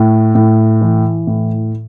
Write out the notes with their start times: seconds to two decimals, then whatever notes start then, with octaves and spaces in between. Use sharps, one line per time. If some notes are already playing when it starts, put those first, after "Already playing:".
Already playing: A2
0.35 A2
0.81 E3
1.27 A2